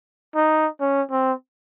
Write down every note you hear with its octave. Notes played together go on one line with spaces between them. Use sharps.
D#4
C#4
C4